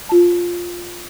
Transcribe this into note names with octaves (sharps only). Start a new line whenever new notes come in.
F4 A5